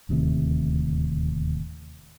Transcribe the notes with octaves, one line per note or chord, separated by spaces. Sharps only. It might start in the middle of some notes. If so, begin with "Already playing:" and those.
D1 D#2 A2 C3